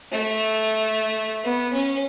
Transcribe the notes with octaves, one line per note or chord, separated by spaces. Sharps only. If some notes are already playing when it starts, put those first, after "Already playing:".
A3
B3
C#4